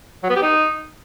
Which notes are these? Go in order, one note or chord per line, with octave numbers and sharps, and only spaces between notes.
F#3
B3
G4
D#4